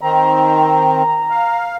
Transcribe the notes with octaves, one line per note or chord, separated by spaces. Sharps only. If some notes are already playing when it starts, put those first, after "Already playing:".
D#3 C4 A#5
F5